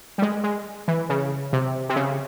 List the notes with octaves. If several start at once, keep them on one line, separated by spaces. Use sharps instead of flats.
G3
G#3
G#3
E3
C#3
C3
C3
C#3